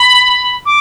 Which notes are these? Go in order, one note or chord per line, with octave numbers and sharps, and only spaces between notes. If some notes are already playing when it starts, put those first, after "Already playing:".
Already playing: B5
D6